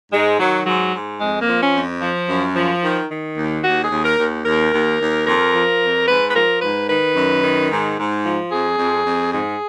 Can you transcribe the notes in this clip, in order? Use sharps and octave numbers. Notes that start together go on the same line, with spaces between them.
G#2 G#3
D#3 F#3
G#2 F#3
G#2
F2 G#3
A#3
F3
C#4
F2
F3
F#2
F3
D#3
D#3
D#2
D#2 F#4
G#4
D#2
A#4
D#2
D#2 A#4
D#2
D#2
F2 A#4
F3
F2
G#2 B4
B4
F3 A#4
G#2 B4
D#3 B4
F#2
D#3
G#2
G#2
F3
F2 G#4
F2
F2
G#2 G#4